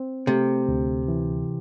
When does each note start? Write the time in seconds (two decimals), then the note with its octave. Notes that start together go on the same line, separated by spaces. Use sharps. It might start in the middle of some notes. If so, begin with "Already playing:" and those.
Already playing: C4
0.27 C3 A3
0.68 D2
1.08 E3